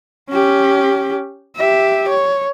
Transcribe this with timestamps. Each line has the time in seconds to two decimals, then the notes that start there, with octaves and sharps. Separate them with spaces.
0.30 C#4 G4
1.56 G4 E5
2.09 C#5